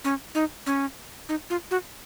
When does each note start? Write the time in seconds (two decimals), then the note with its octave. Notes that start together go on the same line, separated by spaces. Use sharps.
0.04 C#4
0.35 D#4
0.66 C#4
1.29 D#4
1.50 F4
1.71 F#4